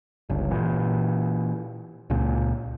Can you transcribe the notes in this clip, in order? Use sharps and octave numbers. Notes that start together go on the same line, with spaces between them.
G1 C#2
A#2 E3
C#2 A#2